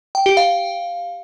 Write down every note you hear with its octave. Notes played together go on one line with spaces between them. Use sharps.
G5
G4
F5